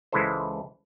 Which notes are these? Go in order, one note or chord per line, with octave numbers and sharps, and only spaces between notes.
C#2 E3 G#3 E4 A4 C5